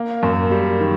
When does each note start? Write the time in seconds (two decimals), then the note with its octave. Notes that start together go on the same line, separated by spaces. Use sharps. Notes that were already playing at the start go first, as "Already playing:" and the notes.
Already playing: A#3
0.23 F#2
0.51 G3
0.80 D#3